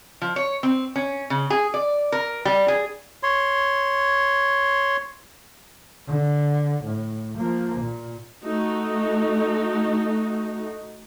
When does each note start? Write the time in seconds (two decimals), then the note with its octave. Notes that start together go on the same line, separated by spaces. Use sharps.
0.22 F3
0.36 C#5
0.63 C4
0.96 C#4
1.30 C#3
1.50 G#4
1.74 D5
2.12 A#4
2.45 G3
2.68 G#4
3.23 C#5 C6
6.09 D3
6.85 A2
7.37 F3 A#3
7.81 A#2
8.43 A3 D#4 F#4